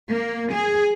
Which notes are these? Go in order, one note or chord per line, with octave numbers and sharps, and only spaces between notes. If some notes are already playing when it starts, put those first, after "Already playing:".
A#3
G#4